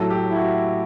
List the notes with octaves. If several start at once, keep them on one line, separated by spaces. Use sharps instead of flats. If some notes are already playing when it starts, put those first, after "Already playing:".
Already playing: A2 F#3 A3 A4
G4
E4
F#4